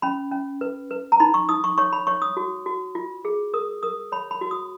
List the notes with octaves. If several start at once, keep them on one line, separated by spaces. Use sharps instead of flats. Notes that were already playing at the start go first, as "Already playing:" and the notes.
C#4 B5
C#4
B4
B4
A#5
D#4 B5
C#6
D#4 D#6
C#6
C#5 C#6
B5
C#5 C#6
D#6
F#4
F#4
F4
G#4
A#4 D#6
A#4 D#6
C#5 B5
B5
F#4
D#6